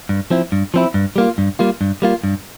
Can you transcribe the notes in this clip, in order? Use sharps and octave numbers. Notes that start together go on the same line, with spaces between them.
G2
F3 C4 E4
G2
F3 C4 E4
G2
G3 A#3 F4
G2
G3 A#3 F4
G2
G3 A#3 F4
G2